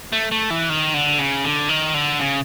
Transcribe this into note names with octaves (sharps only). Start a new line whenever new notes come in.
A3
A3
E3
D#3
D3
C#3
D3
D#3
D3
C#3